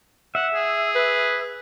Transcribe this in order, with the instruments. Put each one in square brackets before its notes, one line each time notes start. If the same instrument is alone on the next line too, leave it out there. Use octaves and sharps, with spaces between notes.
[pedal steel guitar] E5 [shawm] F#5
[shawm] G#4
[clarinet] B4